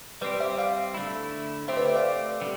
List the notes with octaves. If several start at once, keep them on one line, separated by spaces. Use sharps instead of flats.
G3 C4 G4 B4 D5
C5 E5
D5 F5
D3 A3 E4
A3 C4 G4 C5 E5
B4 D5
C5 E5
D5 F5
D3 G3